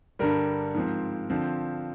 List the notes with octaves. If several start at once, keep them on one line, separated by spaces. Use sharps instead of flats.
G2 D3 G3 A#4
G#2 F3 C4
D3 F3 C4